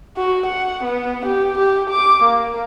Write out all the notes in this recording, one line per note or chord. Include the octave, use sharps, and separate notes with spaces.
F#4
F#5
B3
G4
G4
D6
A#3